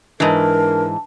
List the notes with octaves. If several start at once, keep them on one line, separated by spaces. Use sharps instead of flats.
G#2 E3 D4 A#4 B4 A5